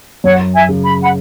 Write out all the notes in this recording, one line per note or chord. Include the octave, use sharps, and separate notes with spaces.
F#2 C#5 F#5
E5 G#5
C#3
B5
F#5 B5